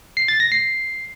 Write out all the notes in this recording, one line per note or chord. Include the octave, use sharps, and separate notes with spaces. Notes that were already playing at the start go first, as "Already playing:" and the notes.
C7
A6
A#6
C7